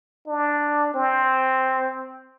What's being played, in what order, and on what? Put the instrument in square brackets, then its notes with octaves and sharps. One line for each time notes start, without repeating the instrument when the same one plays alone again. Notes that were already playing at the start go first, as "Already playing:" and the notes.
[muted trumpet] D4
C4